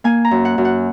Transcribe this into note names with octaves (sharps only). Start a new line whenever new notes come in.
A#3 G#5
A#5
F#2
F#5
F#2
F#5